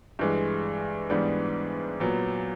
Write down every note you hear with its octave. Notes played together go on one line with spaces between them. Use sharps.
G2 E3 G#3
G#2 E3 G3 B3 D4
A#2 F#3 B3